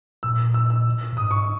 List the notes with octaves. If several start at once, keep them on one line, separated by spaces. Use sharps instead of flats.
A#2 E6
E6
E6
A#2
G#2 D#6
C#6